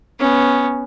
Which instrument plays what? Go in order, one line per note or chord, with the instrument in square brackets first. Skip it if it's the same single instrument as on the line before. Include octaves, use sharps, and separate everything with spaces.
[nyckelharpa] B3 C#4